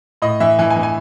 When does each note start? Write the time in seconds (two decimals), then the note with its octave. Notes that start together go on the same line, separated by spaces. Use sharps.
0.22 A2 D#5
0.40 E3 E5
0.59 E3 G#5
0.70 G#5
0.77 E3
0.83 G#5